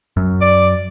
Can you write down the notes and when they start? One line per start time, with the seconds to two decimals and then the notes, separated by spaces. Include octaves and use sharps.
0.17 F#2
0.41 D5